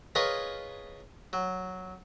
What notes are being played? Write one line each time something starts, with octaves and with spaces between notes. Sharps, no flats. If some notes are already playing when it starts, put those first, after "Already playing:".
F4 G#4 A#4 B4 C#5 D#5
F#3